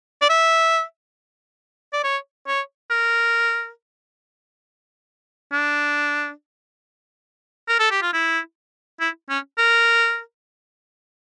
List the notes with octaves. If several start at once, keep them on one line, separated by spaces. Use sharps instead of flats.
D5
E5
D5
C#5
C#5
A#4
D4
A#4
A4
G4
F4
E4
E4
C#4
A#4